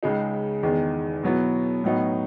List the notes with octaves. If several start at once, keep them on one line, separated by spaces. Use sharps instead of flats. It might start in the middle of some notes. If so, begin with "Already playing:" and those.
C#2 C#3 G#3 D#4
E2 D#3 G#3
B2 F#3 B3 E4
A2 F#3 B3 D#4